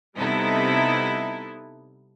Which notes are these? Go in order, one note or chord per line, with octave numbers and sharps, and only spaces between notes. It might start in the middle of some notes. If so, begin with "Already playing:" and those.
C3 G3 B3 D#4 E4 A4